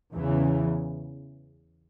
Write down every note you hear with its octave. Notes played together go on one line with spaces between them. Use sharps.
E2 C#3 E3